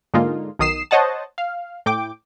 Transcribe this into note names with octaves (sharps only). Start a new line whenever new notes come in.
G#2 D3 G#3 A#3 D#4 F4
B1 D#3 D#6 C7 E7
C5 C#5 D#5 F#5 A5
F5
A2 G5 D6